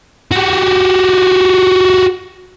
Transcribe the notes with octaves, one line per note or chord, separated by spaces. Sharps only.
F#4 G4